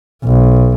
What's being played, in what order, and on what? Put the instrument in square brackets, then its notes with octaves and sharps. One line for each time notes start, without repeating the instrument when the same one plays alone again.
[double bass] B1